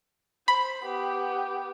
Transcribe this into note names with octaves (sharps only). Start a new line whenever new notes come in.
C5 B5
B3 G4